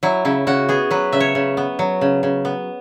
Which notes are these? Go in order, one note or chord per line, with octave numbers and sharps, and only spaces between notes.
F#3 E4
C#3 E4
C#3 F#4
B3 G#4
F#3 B4
C#3 E5
C#5
C#3
B3
F#3
C#3
C#3
B3